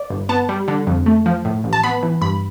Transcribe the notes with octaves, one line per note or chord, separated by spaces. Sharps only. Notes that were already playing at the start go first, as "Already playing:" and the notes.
Already playing: D5
G1
B3 A5
G3
D3
F2
A3
F3
A2
A1
A5
B3 B5
E3
G2 B5